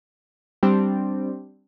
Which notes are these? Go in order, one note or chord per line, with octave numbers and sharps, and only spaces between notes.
G3 C4 D4